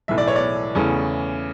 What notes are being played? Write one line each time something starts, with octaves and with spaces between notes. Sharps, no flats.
B1 A2 E3 E5
D5
C#5
D5
E2 C#3 E3 A3 C#4